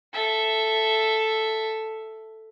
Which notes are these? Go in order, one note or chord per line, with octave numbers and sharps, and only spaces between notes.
A4 E5